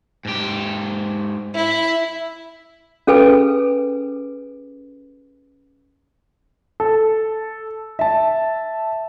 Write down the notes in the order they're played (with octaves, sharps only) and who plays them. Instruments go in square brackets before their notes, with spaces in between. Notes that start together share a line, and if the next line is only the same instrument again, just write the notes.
[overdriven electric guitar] G#2 G4
[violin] E4
[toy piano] C#4 G#4 A4 B4 G#5
[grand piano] A4
E5 A5